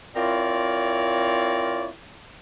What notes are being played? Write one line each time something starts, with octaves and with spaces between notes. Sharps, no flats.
C4 E4 F4 A#4 C#5 D5